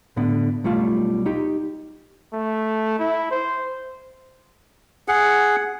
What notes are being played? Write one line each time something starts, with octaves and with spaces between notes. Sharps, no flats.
A2 D3 B3
B1 G3 A3 F4 A5
D#4 G4
A3
E4
C5
G#4 F#5